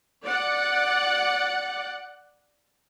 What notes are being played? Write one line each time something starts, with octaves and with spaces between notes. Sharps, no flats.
D5 F#5